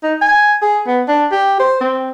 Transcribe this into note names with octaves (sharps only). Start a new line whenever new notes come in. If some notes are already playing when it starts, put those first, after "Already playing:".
D#4
G#5
G#4
B3
D4
G4
C5
C4